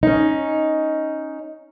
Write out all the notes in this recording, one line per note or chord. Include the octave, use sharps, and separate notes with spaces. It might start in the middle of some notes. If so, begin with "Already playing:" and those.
C#4 D#4